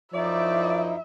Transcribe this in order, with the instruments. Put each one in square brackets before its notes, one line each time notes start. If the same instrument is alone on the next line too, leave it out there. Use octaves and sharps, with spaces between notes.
[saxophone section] F#2 D5 [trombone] F3 [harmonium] D#4 E4 [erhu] E5